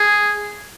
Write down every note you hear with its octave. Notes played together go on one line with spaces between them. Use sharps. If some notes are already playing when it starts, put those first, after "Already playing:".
Already playing: G#4